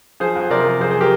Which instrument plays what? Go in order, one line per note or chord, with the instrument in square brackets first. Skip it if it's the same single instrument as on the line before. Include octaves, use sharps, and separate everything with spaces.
[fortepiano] F3 G#4 C5
F2
C3 A#4 D5
F2
F2 G#4 C5
G#4 C5
G4 A#4